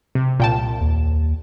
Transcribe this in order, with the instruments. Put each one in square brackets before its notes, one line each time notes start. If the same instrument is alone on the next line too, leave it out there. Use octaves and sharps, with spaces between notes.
[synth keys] C3
[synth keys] C2 E7 [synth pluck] A#2 G5 A5
[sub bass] D#2